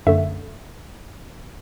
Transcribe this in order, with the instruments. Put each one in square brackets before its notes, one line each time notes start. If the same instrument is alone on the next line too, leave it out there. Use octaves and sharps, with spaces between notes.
[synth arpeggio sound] F#2 D3 A3 E5